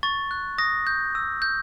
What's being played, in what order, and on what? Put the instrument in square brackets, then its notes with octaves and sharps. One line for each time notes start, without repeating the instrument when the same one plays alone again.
[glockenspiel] C#6 A6
F#6
D#6 A#6
G6
E6
G6